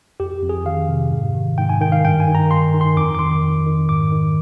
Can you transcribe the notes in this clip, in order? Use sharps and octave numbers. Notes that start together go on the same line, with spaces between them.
F2 G4
F2
G#4
D#3 F5
C3
G#2
D#3
G#2 G5
G#5
D#3 G5
F5
G2 G5
G#5
D#3
A#5
G2 C6
D#3
C6
F2 D6
D6
D#3 C6
F2
D#3
G#2 D6
D#3